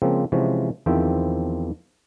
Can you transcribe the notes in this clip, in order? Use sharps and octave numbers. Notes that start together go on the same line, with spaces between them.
C#3 F3 G#3 A#3 C4
C3 E3 F3 G#3 C#4
E2 D#3 F3 C4 E5 G5